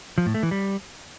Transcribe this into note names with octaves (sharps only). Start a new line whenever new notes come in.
F3
A2
A3
E3
G3